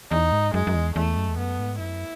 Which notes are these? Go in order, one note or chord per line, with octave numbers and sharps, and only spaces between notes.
E2 D#4
G#2
F#2 G#3
F#2
E2
E2 A3
F#2
E2
F#2 B3
G#2
F#2 E4